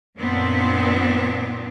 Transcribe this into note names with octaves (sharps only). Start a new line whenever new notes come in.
F#2 A#2 D#3 B3 C4 D4